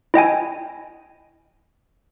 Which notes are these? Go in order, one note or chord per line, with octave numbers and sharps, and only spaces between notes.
E4 D#5 G5 G#5